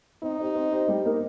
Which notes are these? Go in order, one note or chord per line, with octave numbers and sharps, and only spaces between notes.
C4 D#4
G4 C5 D#5
C4
G4 C5 D#5
G3
A#3 D#4 A#4